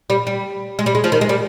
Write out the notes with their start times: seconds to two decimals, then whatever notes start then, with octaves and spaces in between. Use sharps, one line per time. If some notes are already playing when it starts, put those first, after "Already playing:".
0.10 G3
0.27 G3
0.79 G#3
0.86 G3
0.95 G#3
1.04 F3
1.12 D#3
1.21 G#3
1.29 G3